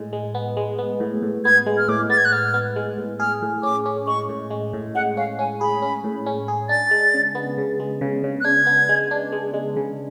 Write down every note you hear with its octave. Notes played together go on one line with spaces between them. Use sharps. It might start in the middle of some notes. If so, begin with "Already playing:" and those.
Already playing: A2 G#3
G#3
B3
G#3
B3
A2
A2
B3 G#6
G#3
F6
A2 D6
B3 A6
G#6
F#6
B3 F6
B3
G#3
A2
G#4 F6
A2
C#4 D6
C#4
G#3 C#6
A2
G#3
A2
G#3 F#5
C#4 F5
C#4 G#5
G#4 B5
C#4
A2
C#4
G#4
D4 A6
G#3
C#3
B3
C#3
G#3
C#3
C#3
F#6
D4 G#6
B3
G#3
D4
G#3
G#3
C#3